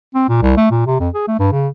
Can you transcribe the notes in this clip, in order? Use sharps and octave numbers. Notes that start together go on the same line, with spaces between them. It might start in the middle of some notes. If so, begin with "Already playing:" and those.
C4
A#2
C2
A3
A#2
C3
F2
G#4
A3
G2
C#3